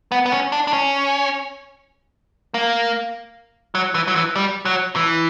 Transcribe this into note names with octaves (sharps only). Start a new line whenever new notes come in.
B3
B3
C#4
D4
D4
C#4
A#3
F#3
E3
F#3
E3
G3
F#3
E3